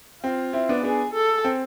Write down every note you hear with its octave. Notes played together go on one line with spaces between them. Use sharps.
C4 F4
C4 E4
B3 D4
B3 D4 G#4
A4
C4